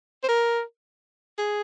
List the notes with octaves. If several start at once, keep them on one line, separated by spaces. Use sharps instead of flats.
C5
A#4
G#4